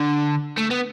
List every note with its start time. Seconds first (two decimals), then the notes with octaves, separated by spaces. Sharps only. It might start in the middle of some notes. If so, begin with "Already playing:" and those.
Already playing: D3
0.58 A3
0.71 B3